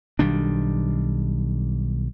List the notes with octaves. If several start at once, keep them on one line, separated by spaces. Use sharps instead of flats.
B1 D#3 G3 D4